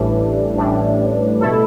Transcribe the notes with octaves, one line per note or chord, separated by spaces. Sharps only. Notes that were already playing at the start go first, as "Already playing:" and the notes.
Already playing: A1 A2 E3 G3 D4
A1 A2 E3 G3 D4
B2 A3 E4 A4